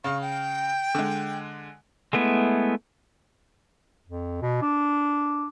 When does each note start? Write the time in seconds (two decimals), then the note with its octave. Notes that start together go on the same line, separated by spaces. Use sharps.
0.04 C#3 F5 C#6
0.21 G5
0.95 D3 G#3
2.13 G#3 A3 B3 E4
4.07 F2
4.42 B2
4.62 D4